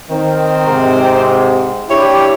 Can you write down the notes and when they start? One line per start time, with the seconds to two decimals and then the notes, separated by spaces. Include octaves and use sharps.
0.11 D#3 C4
0.67 G#2 C3
1.90 D4 E4 G4 C#5